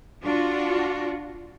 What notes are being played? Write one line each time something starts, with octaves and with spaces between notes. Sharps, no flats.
D4 F4 F#4